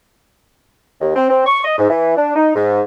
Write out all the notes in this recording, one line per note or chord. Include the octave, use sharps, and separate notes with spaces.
D#2
C4
C4
C#6
D#5
G#2
E3
D4
D#4
G#2